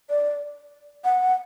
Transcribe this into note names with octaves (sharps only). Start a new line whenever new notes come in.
D5
F#5